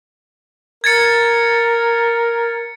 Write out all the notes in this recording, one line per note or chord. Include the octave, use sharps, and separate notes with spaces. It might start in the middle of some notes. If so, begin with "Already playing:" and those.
A#4 G#6 A6 C#7